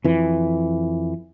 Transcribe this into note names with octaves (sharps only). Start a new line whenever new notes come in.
F2 E3